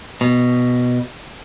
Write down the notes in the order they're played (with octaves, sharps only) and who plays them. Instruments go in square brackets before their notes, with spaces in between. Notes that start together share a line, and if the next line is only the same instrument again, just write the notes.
[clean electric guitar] B2